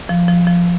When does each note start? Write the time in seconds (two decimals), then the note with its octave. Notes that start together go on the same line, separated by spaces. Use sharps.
0.09 F3
0.28 F3
0.47 F3